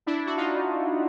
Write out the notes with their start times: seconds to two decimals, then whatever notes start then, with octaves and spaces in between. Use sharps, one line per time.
0.06 D4 E4
0.26 F#4
0.37 D#4 F4